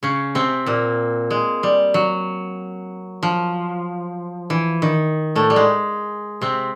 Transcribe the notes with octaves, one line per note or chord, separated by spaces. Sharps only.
C#3 C#4
C3 C4
A#2 A#3
G#3
G3
F#3
F3
E3
D#3
A2 A3
G3
G#3
C3 C4